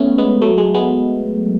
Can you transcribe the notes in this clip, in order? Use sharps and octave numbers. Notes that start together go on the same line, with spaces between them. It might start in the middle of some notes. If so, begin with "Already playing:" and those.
Already playing: A3 B3 C#4
G#3 B3
F#3 A3
G#3
G#3 B3